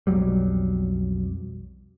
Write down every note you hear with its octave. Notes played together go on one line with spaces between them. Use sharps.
B1 F2 F#3 G3